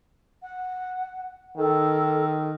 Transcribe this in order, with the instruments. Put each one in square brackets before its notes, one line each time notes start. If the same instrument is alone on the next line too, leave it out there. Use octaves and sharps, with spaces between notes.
[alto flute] F#5
[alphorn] D#3 [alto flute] A4